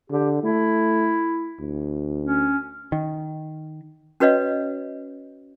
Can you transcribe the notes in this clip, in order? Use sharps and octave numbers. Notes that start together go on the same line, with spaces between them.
D3 G4
A3 E4
D2
C#4
D#3
C#4 F#4 B4 C#5 D#5 F5